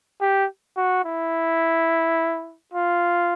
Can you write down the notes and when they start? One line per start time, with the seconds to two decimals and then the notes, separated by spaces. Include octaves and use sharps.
0.21 G4
0.77 F#4
1.05 E4
2.74 F4